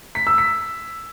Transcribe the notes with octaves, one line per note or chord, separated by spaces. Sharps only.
B6
E6
B6